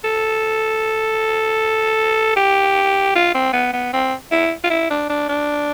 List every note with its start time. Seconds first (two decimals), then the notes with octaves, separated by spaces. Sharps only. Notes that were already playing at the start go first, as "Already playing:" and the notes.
0.04 A4
2.36 G4
3.15 F4
3.34 C4
3.53 B3
3.73 B3
3.93 C4
4.32 E4
4.64 F4
4.70 E4
4.90 D4
5.09 D4
5.29 D4